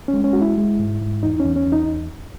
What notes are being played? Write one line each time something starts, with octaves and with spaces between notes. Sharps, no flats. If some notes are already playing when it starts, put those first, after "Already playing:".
C#4
G#3
C#4
G#3 F#4
E4
G#3
G#2
G#2
E2 D#4
E2 C#4
C#4
E2
D#4